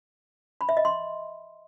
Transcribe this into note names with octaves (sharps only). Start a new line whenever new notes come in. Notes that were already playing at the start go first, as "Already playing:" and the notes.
B5
E5
D#5
C6